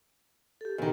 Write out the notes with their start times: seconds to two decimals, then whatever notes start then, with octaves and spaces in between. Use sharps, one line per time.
0.61 G4 A4
0.78 E2 D#3